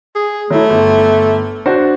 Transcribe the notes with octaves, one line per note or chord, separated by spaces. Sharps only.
G#4
F#3 A3 E4
G1
D4 F#4 C5